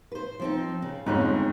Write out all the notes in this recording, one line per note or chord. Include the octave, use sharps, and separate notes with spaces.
B4 C5
F3 C4 D#4
C#3
G1 F2 G#2 G#3 C#4 D#4